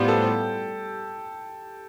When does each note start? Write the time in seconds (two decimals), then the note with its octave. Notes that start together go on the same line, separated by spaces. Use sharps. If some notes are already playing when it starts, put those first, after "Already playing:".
Already playing: A2 G3 B3 F4 G4 C5
0.08 A4